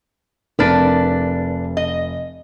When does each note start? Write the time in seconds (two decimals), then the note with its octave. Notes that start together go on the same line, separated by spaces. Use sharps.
0.59 F1 D4 A#4 B4 A6
1.77 D#5